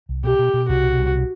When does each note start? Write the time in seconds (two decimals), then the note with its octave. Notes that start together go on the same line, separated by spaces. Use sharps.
0.09 C2
0.24 B2 G4
0.39 B2
0.54 B2
0.68 C2 F#4
0.83 B2
0.98 C2
1.13 B2